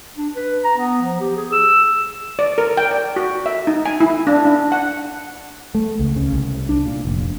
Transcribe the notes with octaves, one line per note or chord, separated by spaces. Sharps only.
D4
B4
A#5
B3
F3
G4
G#4
E6
D5
A#4
G5
D5
F#4
E5
D#4
G#5
E4
D4
D4
F#5
A3
C#2
C#3
C2
D4
A#2
F1